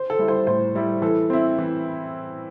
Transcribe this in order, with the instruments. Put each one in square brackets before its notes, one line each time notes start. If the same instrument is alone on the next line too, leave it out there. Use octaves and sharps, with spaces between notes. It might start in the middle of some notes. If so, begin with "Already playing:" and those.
Already playing: [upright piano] C5
A4
[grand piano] G3 E4
[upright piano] C5
[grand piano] A2 [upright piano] C5
[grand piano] G3 E4
[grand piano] E3 [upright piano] A4
[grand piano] C4 E4
E3